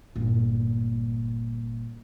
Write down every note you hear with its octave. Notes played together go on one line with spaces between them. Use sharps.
G1 A#2